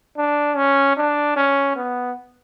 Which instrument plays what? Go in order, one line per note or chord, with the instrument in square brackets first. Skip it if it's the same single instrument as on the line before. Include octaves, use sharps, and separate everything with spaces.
[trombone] D4
C#4
D4
C#4
B3